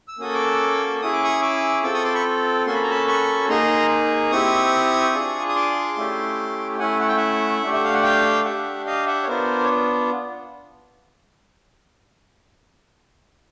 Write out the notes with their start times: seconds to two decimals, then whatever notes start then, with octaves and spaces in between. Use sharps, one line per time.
0.08 E6
0.18 A#3 C#4 F#4 A4 D#6
0.34 D6 E6
1.02 C#4 E4 G#4 D#6
1.12 D6
1.24 C#6 D#6
1.42 D6 E6
1.83 C4 F4 A4 D6 E6
1.94 C#6 D#6
2.04 C6 D6
2.14 B5 C#6
2.66 A#3 C#4 F#4 A4 C6
2.74 B5
2.83 A#5
2.90 A5 B5
3.07 B5 C#6
3.49 A#3 D#4 G#4 A#5 C6
4.31 C4 E4 G4 C#6 D#6
5.14 D4 F4 G#4
5.49 D#6
5.55 C6 D6
5.97 A3 C#4 E4 G4
6.79 A3 C#4 E4 F#5 G#5
7.00 F#5
7.08 G5
7.16 E5 F#5
7.63 A3 D4 G4
7.74 E5
7.84 F5
7.94 F#5
8.03 F5 G5
8.45 D4 G4 E5 F#5
8.86 D#5 F5
9.07 E5 F#5
9.23 C#5
9.27 B3 D4 F4 A#4 C5
9.64 C#5